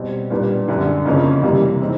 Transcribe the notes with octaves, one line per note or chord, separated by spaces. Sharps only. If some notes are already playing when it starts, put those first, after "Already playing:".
Already playing: B2 G3 C4
A#2 G3 B3 D4
F#2 D3 G3
F2 C#3 F3 A#3 C#4
C3 E3 G3 A#3
E3 G#3 C4 D#4